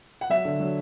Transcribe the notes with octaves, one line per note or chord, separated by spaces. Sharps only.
F#5
F#3 E5
D3
F#3